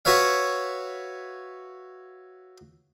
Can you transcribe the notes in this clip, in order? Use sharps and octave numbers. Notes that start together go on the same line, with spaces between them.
F#4 B4 C#5 E5 F5